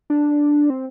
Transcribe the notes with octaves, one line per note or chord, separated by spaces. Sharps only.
D4
C4